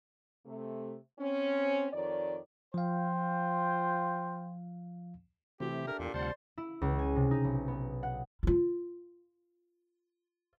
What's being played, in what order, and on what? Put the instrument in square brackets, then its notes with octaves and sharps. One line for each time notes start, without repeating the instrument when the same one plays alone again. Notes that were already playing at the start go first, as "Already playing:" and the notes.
[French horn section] C3 A3
C4 C#4
F2 D#3 C#5 D5
[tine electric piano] F3 F5 [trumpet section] F4 C5 G5
[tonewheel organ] C3 [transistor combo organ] E3 A3 C4 [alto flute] F#4 [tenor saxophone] G4
[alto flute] E5
[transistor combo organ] D4 G4 A4 [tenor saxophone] A#4
[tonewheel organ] E2 [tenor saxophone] A#2
[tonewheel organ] D2 F4 F#5 [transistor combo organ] C3 G3 A5 [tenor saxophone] C5 [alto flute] D5
[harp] E4
C#2
G#5
C3
D#4
B1
B3
F#5
[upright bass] E4 F4